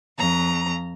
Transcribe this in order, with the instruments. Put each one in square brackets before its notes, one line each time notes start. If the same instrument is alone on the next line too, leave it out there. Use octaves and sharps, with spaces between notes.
[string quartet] F2 A#5